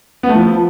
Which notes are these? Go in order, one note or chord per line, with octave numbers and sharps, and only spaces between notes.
B3
A3
F3